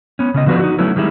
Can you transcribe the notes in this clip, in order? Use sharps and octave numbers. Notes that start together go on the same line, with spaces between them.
B3 C#4
C#3 C#4 D#5
D3 F3 B3 F#4 B4 D5
D#4 F#4
F#3 A3 B3 C#4 E4
D#3 G3 G#3 E4